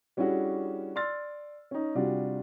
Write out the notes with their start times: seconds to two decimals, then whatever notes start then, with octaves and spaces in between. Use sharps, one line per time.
0.17 G3 C#4 D4 E4 F#4 G#4
0.96 D5 C6 E6 F6 A6
1.71 C#4 D#4
1.95 C3 G3 D4 F4 F#4